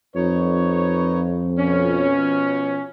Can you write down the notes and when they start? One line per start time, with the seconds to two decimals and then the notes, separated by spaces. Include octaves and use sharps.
0.16 F2 D#4 B4 C#5
1.58 B2 F3 C#4